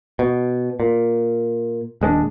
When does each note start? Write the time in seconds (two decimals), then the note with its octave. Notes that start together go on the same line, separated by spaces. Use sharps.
0.19 B2
0.80 A#2
2.01 D#1 G#3 B3 D4